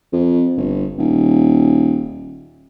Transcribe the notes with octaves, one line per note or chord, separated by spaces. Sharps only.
F2
G1
D#1